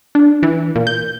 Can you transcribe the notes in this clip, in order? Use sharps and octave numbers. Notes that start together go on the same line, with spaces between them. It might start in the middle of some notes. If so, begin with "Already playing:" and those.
D4
E3
A#2
G6